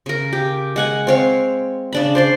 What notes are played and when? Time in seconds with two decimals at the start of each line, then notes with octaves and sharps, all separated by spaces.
0.06 C#3 A#4
0.33 G4
0.76 G#3 F#5 G#5
1.07 C4 C#5 F5
1.92 C#3 D4 B5
2.15 C5 D5 C6